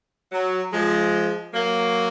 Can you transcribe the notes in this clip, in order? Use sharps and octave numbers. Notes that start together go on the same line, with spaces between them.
F#3
F3 G#3
F#3 A#3